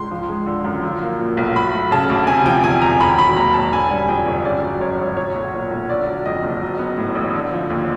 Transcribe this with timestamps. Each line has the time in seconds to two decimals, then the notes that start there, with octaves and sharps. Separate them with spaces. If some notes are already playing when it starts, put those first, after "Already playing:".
Already playing: C#2 C6
0.11 F3
0.29 G#3
0.46 D3
0.64 F#2
0.83 F3
1.02 A#3
1.19 A#2
1.37 B1
1.55 F#3 B5
1.73 A3
1.91 C#3 A5
2.10 D2
2.27 C3 G#5
2.45 F3 G5
2.64 E2 G#5
2.82 E1 A#5
3.00 D#3 B5
3.18 F#3 B5
3.36 D#2 A#5
3.54 E1 A5
3.72 D3 G#5
3.91 G3
4.08 F2 G5
4.27 G1
4.45 C#3 D5
4.62 F#3
4.80 F#2 C#5
4.99 G#1
5.17 F#3 C#5
5.35 B1
5.54 A#2
5.71 B1
5.89 D3 D5
6.07 F#3
6.26 F2 D#5
6.44 F#1
6.62 F#3
6.79 B3
6.98 A2
7.15 A1
7.35 D3
7.53 F3
7.70 D#2